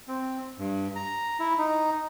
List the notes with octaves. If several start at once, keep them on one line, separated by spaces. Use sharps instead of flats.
C4
G2
A#5
E4
D#4